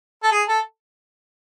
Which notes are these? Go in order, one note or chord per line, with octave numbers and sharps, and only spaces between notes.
A4
G#4
A4